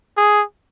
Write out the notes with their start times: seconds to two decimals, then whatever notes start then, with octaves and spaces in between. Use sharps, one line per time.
0.17 G#4